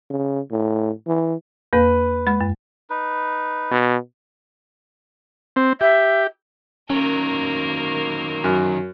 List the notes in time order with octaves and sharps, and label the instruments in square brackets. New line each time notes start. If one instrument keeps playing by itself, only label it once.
[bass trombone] C#3
A2
E3
[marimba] E2 A#3 [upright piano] B4
[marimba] G#3 B5
F#2
[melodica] D#4 B4
[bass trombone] B2
[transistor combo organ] C4
[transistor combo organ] G4 [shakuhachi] E5
[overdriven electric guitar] D#3 F#3 [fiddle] A#3 A#4 [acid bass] C#4
[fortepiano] F#2